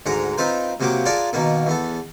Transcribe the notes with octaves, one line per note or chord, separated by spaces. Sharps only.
D2 G#2 G#3 F#5 A#5
C4 D#4 F4 B4 C5
C3 F#3 A#3 G4
F4 G#4 A#4 D5 F#5 A5
B2 D#3 A#3 B3
E2 B3 A4